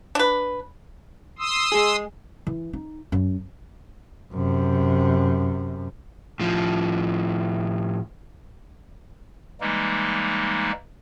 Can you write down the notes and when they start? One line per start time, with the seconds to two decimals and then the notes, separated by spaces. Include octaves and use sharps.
0.15 D4 B4
1.39 C6 D#6 E6
1.72 G#3 G#4
2.47 E3
2.73 D#4
3.12 F#2
4.33 F#2 C3
6.40 A2 F3
9.61 E3 G3 G#3 A#3 D#4